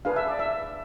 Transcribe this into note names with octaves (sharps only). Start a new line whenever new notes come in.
D4 G#4 B4 F5
E5
D5
E5